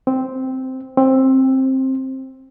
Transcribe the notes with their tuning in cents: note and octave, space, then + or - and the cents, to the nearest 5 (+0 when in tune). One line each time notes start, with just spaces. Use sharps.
C4 -5
C4 +15